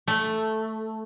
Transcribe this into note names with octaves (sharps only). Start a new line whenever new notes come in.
A3